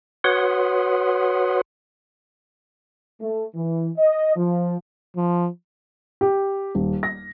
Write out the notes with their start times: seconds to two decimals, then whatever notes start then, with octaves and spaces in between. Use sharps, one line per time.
0.24 F#4 B4 C#5 F#5 C6 D#6
3.21 A3
3.55 E3
3.98 D#5
4.37 F3
5.16 F3
6.21 G4
6.75 D#1
7.03 A#6